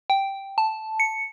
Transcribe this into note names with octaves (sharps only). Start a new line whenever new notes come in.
G5
A5
C#7